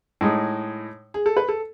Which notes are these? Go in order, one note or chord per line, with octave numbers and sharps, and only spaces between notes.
A2 G#3 D#4
G#4
A4
B4
A4